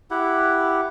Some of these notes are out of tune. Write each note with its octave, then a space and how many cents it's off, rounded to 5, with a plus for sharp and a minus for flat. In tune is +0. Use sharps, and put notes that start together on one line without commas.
E4 +0 G4 +0 F#5 +0